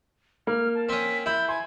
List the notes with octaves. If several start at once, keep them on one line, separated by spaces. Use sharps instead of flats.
A#3 F6
A5
C4 C#4 B6
E4 G6
G#5 C6